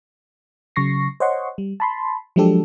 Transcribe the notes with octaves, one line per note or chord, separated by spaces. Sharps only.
C#3 F#3 C#6 A#6 C7
C5 C#5 D#5 F#5 C6 C#6
G3
A5 B5 C6
F3 F#3 G#3 D4 G4 A4